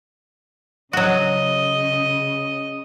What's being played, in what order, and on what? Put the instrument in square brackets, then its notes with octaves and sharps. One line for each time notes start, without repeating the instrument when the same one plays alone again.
[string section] C#3 [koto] F#3 F#4 [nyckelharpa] D#5